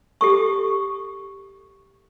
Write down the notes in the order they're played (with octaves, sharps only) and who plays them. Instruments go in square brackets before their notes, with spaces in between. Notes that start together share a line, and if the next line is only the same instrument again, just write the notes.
[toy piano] G4 A4 C#6